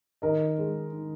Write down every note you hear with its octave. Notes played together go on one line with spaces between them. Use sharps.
D#3 A#4 D#5
G#3
D#3